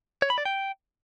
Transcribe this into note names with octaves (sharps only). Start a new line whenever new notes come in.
C#5
B5
D5
G5